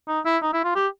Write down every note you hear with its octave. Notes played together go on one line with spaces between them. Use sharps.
D#4
E4
D#4
E4
F4
G4